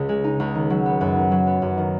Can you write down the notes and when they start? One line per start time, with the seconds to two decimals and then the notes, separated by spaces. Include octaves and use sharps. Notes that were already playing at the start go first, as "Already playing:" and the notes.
Already playing: C#2 C#3
0.09 G#3
0.24 D#4
0.40 C#2
0.55 D#3
0.70 F#3
0.86 B3
1.01 F#2
1.16 D#3
1.31 F#3
1.47 B3
1.62 F#2
1.78 D#3